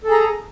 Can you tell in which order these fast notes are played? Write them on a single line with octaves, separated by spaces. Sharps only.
A4 G#4 A#5